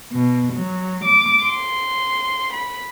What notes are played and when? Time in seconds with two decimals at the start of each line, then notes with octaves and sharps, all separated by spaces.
0.12 B2
0.53 F#3
1.04 D6
1.47 C6
2.52 B5